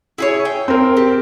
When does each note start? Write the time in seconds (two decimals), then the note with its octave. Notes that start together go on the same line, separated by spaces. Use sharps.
0.18 E4 G#4 C#5
0.45 G5
0.68 C4 A#4
0.97 G4